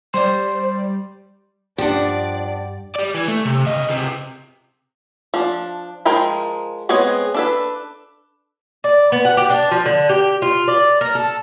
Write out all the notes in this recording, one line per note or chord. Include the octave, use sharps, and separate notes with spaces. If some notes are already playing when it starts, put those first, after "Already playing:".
G3 C5 D5 C6
G2 F3 D4 G4 D5 F#5
G4 D5
E3
A3
C3
C#3 D#5
C#2 C3
F3 D4
F3 G#3 A#4 G5 B5
G#3 B3 C4 G#4 C#5
D4 A4 B4
D5
B3
F#5
G4
D4
F3
D3
G4
F4
D5
A#4
A4